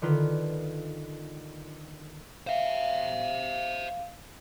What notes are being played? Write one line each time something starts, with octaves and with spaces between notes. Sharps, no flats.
D3 D#3 F4 B4
C5 E5 F5